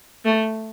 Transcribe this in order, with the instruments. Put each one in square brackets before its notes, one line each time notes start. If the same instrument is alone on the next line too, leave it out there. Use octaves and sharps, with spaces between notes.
[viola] A3